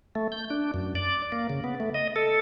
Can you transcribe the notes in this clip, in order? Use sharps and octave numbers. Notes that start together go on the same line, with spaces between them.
A3
G6
D4
F#2
D5
A#3
C#3
B3
A3
D#5
A4